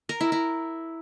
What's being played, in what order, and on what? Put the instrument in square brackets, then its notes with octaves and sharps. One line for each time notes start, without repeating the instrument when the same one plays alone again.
[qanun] A#4
E4
E4